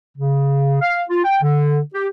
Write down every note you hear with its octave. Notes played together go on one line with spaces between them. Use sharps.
C#3
F5
F4
G5
D3
G4